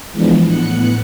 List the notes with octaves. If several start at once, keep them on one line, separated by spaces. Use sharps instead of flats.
E3 F3 G#3 B3 D4
A2 B3 F#6 C#7